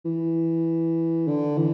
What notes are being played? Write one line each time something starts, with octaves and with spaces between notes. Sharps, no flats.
E3
D3
E3